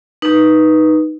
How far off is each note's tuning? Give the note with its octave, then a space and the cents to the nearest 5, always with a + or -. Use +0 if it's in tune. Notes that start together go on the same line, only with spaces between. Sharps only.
D#4 +0 B4 -15